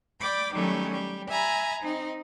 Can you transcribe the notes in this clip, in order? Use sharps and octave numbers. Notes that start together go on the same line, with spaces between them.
D5 G5 B5 D6
D#3 F#3 G3 A3 C#4
G3
E5 G#5 A#5 B5
C4 D#4